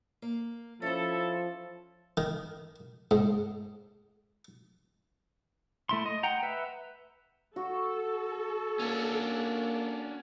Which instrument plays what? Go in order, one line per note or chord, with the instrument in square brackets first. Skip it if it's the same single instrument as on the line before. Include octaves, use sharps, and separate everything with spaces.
[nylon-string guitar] A#3
[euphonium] F3 [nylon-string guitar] C#4 C5 [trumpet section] E4 A4 E5
[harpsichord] D#3
G#2
[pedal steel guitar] A3 E4 C6
D#5
F#5 G5 A#5
B4 E5
[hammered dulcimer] F#4 [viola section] A4
[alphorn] A#3 [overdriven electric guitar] C#4 D4